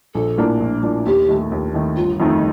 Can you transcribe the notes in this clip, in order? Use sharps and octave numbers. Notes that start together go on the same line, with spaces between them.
A#1 A4
A2 F3 A#3 D4
A#1
A2 F3 A#3 D4
D#2 G4
D#3 A3
D#2
D#3 A3
G1 F4
F2 D#3 A3 D#4